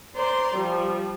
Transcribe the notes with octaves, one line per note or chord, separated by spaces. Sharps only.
C5 D5 A#5 C6
F3 G3